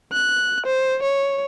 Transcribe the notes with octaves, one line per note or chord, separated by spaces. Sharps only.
F#6
C5
C#5